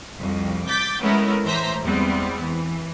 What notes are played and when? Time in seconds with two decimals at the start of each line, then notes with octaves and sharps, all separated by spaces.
0.19 C2 F2
0.67 D6 G6 A6 B6
1.01 G#3 A3 B3 C#4 E4 A#4
1.44 A2 E3 C5 E5 A#5 B6
1.83 E2 G3 G#3 B3 C4
2.41 E3